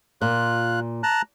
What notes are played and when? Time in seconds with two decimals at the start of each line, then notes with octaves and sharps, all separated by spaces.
0.21 A#2 F4 F#6
1.03 A5 A#5 F#6